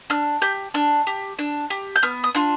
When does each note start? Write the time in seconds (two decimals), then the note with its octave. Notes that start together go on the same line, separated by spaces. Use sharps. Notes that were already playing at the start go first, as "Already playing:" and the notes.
0.10 D4 F6
0.42 G4 G6
0.74 D4 F6
1.07 G4
1.39 D4
1.70 G4
1.96 G6
2.03 B3 F6
2.24 D#6
2.35 D4 F4